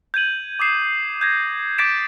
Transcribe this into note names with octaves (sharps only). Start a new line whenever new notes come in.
G6 G#6 D#7 F#7
D6 D#6 C7 E7
G6 G#6 A#6
D6 G6 A6 B6 D7 E7